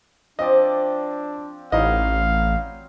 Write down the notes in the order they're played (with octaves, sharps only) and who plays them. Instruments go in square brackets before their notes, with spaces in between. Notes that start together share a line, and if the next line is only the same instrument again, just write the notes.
[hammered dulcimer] F3 C4 D5 [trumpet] D4 [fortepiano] D#5
[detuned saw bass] A1 [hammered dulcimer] F#3 [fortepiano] D#4 E4 D#5 [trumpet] F5